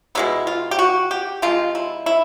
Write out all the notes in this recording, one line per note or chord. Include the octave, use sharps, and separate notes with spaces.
B2 G#3 B3 E4
F4
G4
F#4
G4
C3 F3 G#3 F4
E4
E4